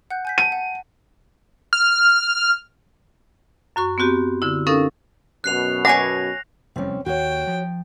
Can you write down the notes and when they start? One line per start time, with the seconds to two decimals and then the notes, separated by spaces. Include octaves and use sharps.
0.11 F#5 F#6 G6
0.25 G#5 G6 B6
0.38 F#5 A5 D#7
0.52 F#5
1.73 F6
3.76 F#2 F#4 C#6
3.98 B3 C4 F#4 G4
4.42 D3 E4
4.67 C#4 D#4 A4 A#4 F5
5.44 F#2 B2 F#6 C7 F7
5.85 C#5 F#5 G#5 D6 A#6
6.76 F1 E2 G3 C4 C#4
7.06 D#2 F#4 C#5 G5
7.47 F3